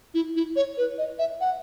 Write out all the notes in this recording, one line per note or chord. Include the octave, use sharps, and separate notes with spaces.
E4
E4
C#5
B4
D#5
E5
F#5